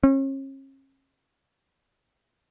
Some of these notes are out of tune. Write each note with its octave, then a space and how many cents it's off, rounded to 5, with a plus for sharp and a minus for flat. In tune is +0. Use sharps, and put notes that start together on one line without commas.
C#4 -40